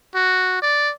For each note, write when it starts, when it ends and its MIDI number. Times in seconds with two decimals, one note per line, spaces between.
0.15 0.59 66
0.62 0.92 74